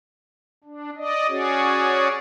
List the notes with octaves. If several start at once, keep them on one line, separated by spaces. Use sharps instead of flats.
D4
D5 D#5
C#4 F#4 G#4 C#5 D5